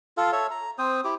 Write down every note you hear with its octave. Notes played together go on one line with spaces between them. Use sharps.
F4 A4 F5
A4 C#5 E5
A#5
C4 C5 D#6
E4 G4 D6